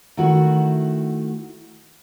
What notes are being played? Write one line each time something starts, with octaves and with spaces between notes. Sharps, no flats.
D#3 A3 E4 F#4